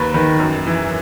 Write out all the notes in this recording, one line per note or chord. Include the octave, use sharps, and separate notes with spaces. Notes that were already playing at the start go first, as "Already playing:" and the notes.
Already playing: D#2 B4
D#3 B4
F#2
E3